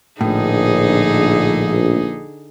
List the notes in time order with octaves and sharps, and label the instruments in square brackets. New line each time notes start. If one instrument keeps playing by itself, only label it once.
[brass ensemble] A#1 [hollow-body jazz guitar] A2 [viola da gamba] D3 D#4 G#4